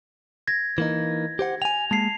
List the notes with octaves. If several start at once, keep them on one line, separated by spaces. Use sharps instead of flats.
G#6 A#6
E3 A#3 D#4
G4 C5 F#5
G5 G#5 F7
G#3 A#3 A5 C7